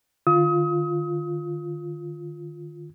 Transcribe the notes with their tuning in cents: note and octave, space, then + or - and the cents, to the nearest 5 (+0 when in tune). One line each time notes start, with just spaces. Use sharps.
D#3 -45 F4 +0 D#6 +35